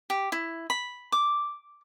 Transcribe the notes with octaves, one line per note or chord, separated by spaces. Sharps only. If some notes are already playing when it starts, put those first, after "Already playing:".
G4
E4
B5
D6